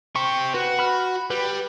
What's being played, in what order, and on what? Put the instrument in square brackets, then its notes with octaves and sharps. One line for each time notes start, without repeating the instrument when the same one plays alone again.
[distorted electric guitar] G4 C5 [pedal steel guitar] C#6
[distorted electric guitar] F#4 [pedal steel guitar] B4
[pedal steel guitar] B5 F6
[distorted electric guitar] G3 [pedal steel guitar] B4